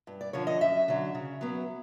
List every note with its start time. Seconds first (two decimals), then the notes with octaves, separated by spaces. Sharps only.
0.07 G2
0.21 D5
0.33 D3 F3 C#5
0.47 D#5
0.61 F#2 E5
0.88 D3 F#3
1.15 C#3
1.41 F#3 B3